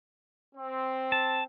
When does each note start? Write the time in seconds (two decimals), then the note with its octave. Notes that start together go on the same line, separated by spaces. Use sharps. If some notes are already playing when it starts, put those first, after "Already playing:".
0.55 C4
1.12 A5